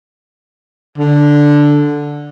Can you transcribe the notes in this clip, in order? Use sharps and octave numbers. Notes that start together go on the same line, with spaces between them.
D3